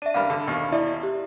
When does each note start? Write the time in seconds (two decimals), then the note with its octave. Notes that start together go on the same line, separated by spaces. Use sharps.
0.02 D4 E5 D#7
0.14 A1 G2 A#4 F5 B5 F6
0.30 D3
0.47 D#2 B2
0.72 E4 D5 E5
1.03 G4